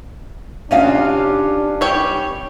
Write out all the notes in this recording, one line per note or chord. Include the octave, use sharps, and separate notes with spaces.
C3 D#3 C#4 D4 F4 F#4
G3 C#5 G5